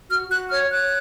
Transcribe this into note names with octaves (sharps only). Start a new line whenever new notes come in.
F#4 F6
F#4 F#6
C#5 F6
C#5 F#6